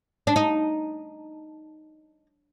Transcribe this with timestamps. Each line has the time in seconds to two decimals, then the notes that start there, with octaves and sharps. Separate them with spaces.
0.27 D4
0.36 D#4